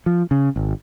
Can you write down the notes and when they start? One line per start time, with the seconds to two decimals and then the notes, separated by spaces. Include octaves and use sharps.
0.06 F3
0.31 C#3
0.56 G#1